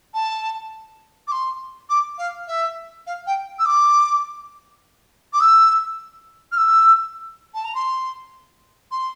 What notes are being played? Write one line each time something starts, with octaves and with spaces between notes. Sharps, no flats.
A5
D6
C6
D6
F5
E5
F5
G5
E6
D6
D6
E6
F6
E6
A5
A#5
C6
C6